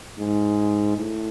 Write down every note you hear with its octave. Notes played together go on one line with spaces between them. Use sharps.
G#2
A2